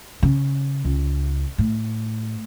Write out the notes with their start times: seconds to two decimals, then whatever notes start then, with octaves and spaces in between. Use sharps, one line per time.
0.23 C#3
0.85 C#2
1.58 A2